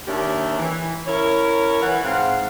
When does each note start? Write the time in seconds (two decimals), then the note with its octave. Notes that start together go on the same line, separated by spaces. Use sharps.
0.07 D#2 D4 G4 A#4 C#5 E5
0.58 E3
1.07 C#4 E4 A#4 C#5
1.81 E3 B4 F#5
2.03 G#2 C4 F5 F#5